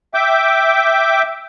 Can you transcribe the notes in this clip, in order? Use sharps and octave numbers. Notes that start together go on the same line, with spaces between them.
E5 G5 D6